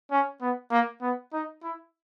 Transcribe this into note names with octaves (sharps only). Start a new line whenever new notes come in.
C#4
B3
A#3
B3
D#4
E4